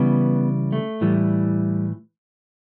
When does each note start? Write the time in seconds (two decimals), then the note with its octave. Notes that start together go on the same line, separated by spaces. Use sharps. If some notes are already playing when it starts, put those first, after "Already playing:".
Already playing: C#3 E3 G3 B3
0.72 A3
1.01 A2 E3 G3